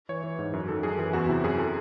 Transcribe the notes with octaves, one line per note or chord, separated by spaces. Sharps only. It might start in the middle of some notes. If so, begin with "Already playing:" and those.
E3 C#5
E3
G#2
F#2
D#3 A4
F#2 G#4
E3 G#4
E2 F#4
C3 E4
F#2 G#4
A4